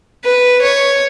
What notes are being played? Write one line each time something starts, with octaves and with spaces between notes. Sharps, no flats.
B4
C#5